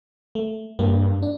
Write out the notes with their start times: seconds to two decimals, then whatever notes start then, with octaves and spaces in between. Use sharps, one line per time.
0.35 A3
0.79 G2 A#3
1.22 D4